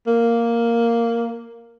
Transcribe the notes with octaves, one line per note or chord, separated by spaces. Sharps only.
A#3